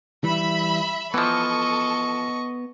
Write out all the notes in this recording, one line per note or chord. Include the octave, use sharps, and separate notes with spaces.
E3 G3 E5 B5
E3 F3 B3 A4 D#5 C#6